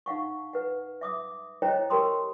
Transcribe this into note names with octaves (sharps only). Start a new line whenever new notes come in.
D#4 F5 F#5 C#6
B4 F#5
E5 D6 D#6
E4 C5 C#5 D#5 G5 A#5
G4 A#4 G5 A#5 C6 D#6